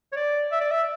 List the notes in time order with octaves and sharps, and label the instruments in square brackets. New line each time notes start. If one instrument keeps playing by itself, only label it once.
[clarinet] C#5
D5
E5
D5
E5